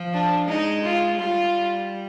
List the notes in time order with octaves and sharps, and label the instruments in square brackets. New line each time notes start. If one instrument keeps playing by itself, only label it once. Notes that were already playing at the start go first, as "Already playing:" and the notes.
Already playing: [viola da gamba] F3
[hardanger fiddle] D4
[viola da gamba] G#3 [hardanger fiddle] D#4
[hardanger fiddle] F4
[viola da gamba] G3 [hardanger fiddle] F4